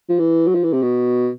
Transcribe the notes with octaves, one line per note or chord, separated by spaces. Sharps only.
F3
E3
F#3
F3
E3
C3
B2